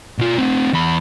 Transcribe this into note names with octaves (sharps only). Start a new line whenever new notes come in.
B2 F4
A3 C4
E2 B5